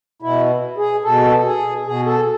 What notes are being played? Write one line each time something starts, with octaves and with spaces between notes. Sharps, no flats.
B2 E4
G#4
B2 A4
G#4
B2 G#4
A4